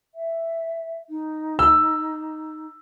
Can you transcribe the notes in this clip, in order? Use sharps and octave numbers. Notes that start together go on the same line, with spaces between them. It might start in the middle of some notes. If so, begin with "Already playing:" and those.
E5
D#4
E6